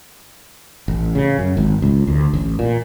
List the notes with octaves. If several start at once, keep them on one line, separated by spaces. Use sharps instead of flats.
A1
C#3
F#2
G#1
C#2
D2
A1
A#2